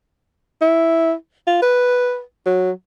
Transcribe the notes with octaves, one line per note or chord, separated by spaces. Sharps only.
E4
F4
B4
F#3